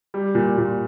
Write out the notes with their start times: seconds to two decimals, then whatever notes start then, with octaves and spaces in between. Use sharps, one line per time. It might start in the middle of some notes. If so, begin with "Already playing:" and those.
0.14 G3
0.35 A#2
0.58 A#2